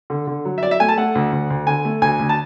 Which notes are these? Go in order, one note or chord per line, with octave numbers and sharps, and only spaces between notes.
D3
D3
F#3
E5
F#3 D5
E5
A3 G#5
A5
A3 F#5
D2
D2
D2
D3 G#5
A3
D2 G#5
D2
A5